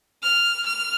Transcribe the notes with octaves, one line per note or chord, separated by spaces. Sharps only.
F6
F6